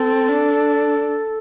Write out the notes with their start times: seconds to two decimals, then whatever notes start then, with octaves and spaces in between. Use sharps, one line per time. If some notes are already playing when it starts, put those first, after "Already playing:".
Already playing: C4 A4
0.28 D4